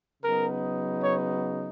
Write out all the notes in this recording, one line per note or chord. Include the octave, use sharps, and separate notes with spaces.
C#3 F#3 B3 D#4 A#4
C#5